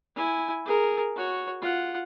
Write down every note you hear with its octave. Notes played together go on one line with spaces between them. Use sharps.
E4 G#5
G#4 A#4
F#4 C#5
F4 F#5